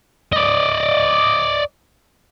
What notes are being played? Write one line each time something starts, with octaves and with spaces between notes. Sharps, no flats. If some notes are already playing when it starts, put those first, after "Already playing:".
D5 D#5